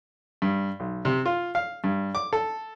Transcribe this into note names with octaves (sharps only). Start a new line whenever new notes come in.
G2
B1
C3
F4
F5
G2
D6
A4